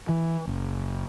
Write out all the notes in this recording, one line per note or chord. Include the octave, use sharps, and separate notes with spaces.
E3
F#1